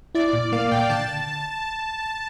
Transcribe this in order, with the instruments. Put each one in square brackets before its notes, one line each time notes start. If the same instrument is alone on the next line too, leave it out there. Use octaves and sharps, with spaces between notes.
[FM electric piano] E4 [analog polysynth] D5
[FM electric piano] A#2
[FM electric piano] A#3 [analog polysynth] F5
[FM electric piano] A#2 [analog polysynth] G5
[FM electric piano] D3 [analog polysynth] A5